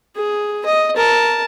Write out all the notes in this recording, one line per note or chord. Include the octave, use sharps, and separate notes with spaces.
G#4
D#5
A#4 A5